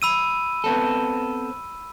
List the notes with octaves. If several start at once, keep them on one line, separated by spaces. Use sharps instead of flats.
B5 E6 D#7
B3 C4 A4